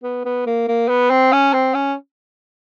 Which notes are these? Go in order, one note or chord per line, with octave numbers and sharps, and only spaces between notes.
B3
B3
A#3
A#3
B3
C4
C#4
C4
C#4